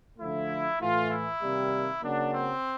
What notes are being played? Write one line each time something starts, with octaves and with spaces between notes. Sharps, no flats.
D3 F3 A3 E4
A2 E3 A3 F4
E4
C3 D#3 G3 A#3
C#3 F#3 A#3 D4
C4